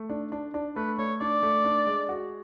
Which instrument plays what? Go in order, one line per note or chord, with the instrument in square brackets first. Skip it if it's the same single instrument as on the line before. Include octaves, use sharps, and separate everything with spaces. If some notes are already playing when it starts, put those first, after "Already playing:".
Already playing: [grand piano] A3
D4
D4
D4
[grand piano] A3 [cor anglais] B4
[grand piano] A3 [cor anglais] C#5
[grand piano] D4 [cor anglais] D5
[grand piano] A3
D4
G#3
F#4